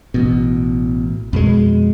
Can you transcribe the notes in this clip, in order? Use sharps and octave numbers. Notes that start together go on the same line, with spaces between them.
A1 B2
F2 B2 G#3